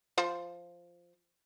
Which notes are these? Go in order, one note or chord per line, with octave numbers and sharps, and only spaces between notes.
F3 F4 C5